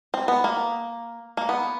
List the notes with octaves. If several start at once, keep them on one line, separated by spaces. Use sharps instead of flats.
C4
B3
A#3
A#3
B3